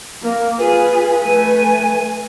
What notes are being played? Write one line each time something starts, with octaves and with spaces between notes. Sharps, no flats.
A#3
F4 G#4 B4
A3 G#5